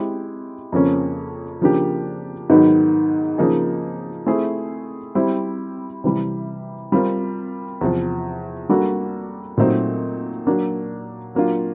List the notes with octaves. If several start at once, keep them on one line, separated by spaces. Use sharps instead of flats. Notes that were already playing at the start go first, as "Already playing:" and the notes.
Already playing: G#3 C4 E4 G4
F2 C#3 F3 A#3 C#4
C#3 F3 A#3 D4 G4
G#2 D#3 F#3 B3
C#3 F3 A#3 D#4 G#4
A3 C4 E4 G#4
G3 C4 E4 G4
C3 E3 G3
G3 C4 F4 A#4
E2 C3 F3
G3 A#3 D4 F#4 A4
A#2 F#3 A3 C4 D#4
F#3 A#3 D4
F#3 A#3 D4 F4